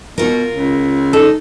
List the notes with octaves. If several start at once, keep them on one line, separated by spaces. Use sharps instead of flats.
B2 F4 A#4
C#2
D#4 A4